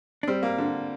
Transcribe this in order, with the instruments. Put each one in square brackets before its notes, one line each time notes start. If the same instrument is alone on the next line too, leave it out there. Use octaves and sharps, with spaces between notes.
[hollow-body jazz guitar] D4
[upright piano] G3 [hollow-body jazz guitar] C4
[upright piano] A#3
D3